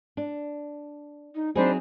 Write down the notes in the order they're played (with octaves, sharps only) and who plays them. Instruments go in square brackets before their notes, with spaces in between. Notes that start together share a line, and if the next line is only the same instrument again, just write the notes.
[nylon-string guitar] D4
[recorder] D#4
[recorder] F#3 [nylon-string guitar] C4 D#4 G#4 [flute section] D4 C5 B5